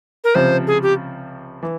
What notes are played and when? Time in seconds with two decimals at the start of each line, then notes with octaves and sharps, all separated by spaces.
0.24 A#4
0.35 C#2 C3 F3 C5
0.67 G#4
0.83 G4
1.63 E3